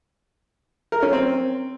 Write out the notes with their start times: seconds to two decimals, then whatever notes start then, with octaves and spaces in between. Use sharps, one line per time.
0.92 A#4
1.03 C#4
1.13 C4